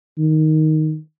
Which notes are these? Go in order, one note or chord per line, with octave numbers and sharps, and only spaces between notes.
D#3